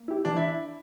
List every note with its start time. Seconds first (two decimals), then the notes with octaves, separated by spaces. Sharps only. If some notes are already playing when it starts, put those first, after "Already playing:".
Already playing: A#3
0.08 E4 G4
0.25 E3 D4
0.36 E4